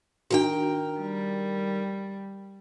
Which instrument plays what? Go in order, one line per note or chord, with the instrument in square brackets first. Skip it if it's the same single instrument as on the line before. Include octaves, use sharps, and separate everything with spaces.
[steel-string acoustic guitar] D#3 A#4 G5 [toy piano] D4 F#4
[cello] G3